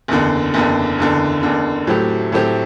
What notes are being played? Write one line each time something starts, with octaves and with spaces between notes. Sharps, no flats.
F#1 E2 D3
F#1 E2 D3
F#1 E2 D3
F#1 E2 D3
A2 F#3 A3 C4 G4
A2 F#3 A3 C4 G4